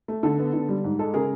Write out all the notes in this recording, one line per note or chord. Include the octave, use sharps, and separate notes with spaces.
A3
D3 A4
B3
D3
G3
G#2
G#3 A4
C#3 G#4 A#4